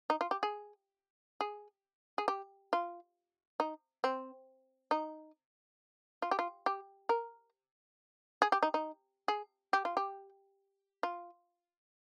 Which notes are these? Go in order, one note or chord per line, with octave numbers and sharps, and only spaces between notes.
D#4
F4
G4
G#4
G#4
G#4
G4
F4
D#4
C4
D#4
F4
G4
F4
G4
A#4
G#4
G4
D#4
D#4
G#4
G4
F4
G4
F4